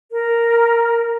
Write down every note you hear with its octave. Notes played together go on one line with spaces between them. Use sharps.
A#4